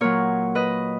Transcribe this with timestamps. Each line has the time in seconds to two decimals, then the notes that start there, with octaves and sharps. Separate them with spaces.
0.01 A#2 F#3 A#4 C#5
0.55 B4 D#5